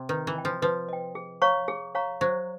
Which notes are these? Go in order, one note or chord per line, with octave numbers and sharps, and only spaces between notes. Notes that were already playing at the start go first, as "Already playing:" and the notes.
Already playing: C3
D#3 B4
E3
D#5 G5
F3
F3 B4
D#5 G5
G#4
C#5 F5 A#5 C#6
G#4
C#5 F5 A#5 C#6
F#3 C5